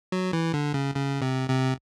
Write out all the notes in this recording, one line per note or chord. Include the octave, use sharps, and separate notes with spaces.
F#3
E3
D3
C#3
C#3
C3
C3